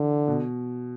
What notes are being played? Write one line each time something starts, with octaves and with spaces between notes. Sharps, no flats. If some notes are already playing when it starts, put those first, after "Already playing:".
Already playing: D3 E3
B2